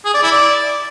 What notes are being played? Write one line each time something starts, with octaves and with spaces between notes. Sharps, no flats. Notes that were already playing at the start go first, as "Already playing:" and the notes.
G#4
D5
E4
D5